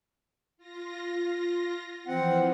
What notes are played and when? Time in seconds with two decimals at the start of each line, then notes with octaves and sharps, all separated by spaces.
0.57 F4 A#6
2.07 E3 F3 C4 F#5